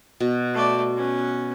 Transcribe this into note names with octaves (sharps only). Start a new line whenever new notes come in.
B2
A3 D5
B3 C#4